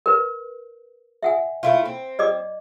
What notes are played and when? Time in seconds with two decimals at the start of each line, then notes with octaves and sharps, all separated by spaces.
0.06 A#4 B4
1.23 E5 F#5 G#5
1.63 A3 E4 F4
1.85 C4
2.19 D5 D#5 D6